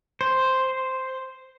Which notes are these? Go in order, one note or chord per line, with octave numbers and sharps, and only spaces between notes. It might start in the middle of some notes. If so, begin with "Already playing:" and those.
C5